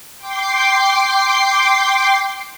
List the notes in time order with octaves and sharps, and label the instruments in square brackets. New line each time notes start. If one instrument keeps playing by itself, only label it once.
[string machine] G5 C6 D6 C7